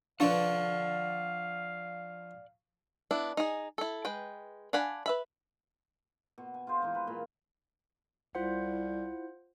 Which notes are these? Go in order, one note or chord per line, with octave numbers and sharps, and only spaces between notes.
F3 D4 B4 C#5 D5 F5 F#5
B3 D4 E4
D#4 G#4
E4 A4
G#3 B4 G5
D4 F5 F#5 G#5 B5
B4 E5 B5
B2
G#5
F4 G#4 C5
E3 G#3 D#4
B4
A#2
C2 E4 F4 C5 F#5